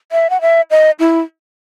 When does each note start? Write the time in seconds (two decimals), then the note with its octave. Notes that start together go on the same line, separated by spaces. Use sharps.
0.12 E5
0.30 F#5
0.41 E5
0.71 D#5
1.00 E4